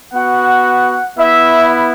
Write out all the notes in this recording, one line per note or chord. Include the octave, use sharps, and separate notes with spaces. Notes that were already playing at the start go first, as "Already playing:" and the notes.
B3 F#4 F#5
B3 E4 E5